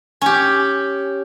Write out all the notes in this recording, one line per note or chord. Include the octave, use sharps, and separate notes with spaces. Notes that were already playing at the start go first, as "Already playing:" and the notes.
C#4 G4